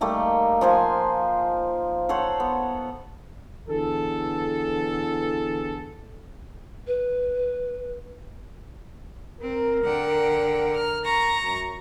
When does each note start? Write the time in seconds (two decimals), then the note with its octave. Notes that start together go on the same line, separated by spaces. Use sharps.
0.01 G3 A3 A#3 D#4
0.61 F3 C5 G#5
2.09 A4 C5 C#5 F#5
2.40 B3
3.68 D3 E3 B3 G#4 A4
6.87 B4
9.41 C4 A#4
9.84 D3 F#5 G5
10.75 F6
11.05 A#5 C#6 A#6
11.41 F#2